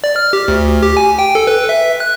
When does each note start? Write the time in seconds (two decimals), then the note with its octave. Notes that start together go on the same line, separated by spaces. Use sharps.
0.04 D5
0.16 F6
0.33 G4
0.48 D2
0.83 G4
0.97 G#5
1.19 G5
1.35 A4
1.47 B4
1.69 E5
2.00 F#6